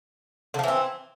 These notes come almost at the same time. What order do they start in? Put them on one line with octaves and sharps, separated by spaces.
D3 F3 E3 C4